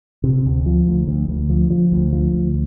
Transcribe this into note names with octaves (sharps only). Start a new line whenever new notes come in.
C3
D2
F3
D2
D2
D2
F3
F3
D2
F3
D2